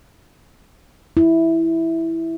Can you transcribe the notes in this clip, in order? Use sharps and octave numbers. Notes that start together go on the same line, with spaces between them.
E4